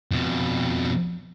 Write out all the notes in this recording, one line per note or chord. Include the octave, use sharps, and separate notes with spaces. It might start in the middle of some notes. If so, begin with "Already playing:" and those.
F2 B2